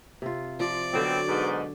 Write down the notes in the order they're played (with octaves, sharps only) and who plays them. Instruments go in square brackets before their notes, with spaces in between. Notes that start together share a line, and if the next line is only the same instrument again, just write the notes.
[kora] C3 F4
[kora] F3 [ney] F4 [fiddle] D5
[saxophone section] B2 C4 [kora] D3 F#3 [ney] F#4
[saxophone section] G#2 B2